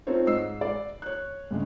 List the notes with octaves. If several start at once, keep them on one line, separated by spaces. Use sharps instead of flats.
C4 D#4 F4 A4 C5 C#5
G#2 D#5 E6 C7
D5
C#5 F#6
G2 C#3 G#3 A3